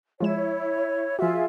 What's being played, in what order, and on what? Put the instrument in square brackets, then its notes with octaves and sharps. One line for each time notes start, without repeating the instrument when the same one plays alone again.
[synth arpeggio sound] F3 G#3 E7 [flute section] E4 C#5
[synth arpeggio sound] F3 F#4 [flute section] F4 G#4 E5